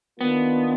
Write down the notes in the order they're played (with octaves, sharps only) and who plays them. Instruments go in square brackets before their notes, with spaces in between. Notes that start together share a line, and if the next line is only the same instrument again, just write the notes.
[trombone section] D#3 A#3 D4 F4 [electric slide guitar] B3